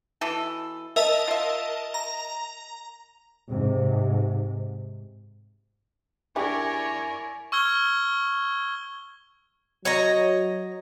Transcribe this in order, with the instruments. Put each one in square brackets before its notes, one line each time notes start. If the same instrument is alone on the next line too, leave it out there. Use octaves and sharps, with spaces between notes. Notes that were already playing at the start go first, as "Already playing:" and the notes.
[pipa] B2 E3 A4
[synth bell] A#4 D#5 A5 [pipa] E5
[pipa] F4 E5
[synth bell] A#5
[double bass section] G#2 C3
[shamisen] D4 G4 G#4 [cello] E4 A#4 [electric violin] C#5 D5 [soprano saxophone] G#5
[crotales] C#6 E6 F6 G#6 G7
[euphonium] F#3 [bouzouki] C#5 D#5 A#5